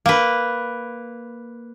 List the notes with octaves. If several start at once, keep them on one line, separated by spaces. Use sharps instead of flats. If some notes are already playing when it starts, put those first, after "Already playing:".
A#3 B4